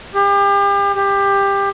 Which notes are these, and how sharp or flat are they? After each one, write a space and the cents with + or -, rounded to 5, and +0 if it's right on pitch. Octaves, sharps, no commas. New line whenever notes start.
G4 +35
G4 +20